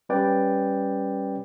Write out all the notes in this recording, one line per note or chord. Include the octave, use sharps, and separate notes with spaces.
G3 C#4 B4 D5 G5